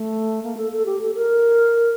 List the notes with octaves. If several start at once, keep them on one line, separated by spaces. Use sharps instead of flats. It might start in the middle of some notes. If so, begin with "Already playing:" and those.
Already playing: A3
A#3
A4
A4
G4
A4
A#4